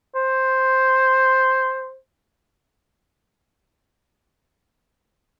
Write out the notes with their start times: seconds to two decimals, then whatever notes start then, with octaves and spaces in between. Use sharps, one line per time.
0.16 C5